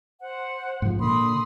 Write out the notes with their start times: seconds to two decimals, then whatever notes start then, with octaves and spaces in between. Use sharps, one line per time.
0.21 C5 F#5
0.82 G#2 F3
0.99 A#2 D3 B5 C6 D#6